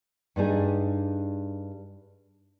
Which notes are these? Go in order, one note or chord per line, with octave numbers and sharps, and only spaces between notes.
G2 D4 D#4 G#4